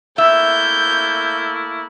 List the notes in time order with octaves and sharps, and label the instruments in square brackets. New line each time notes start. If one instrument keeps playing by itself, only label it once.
[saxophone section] A3 A#3 E4 [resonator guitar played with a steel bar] E5 [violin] G6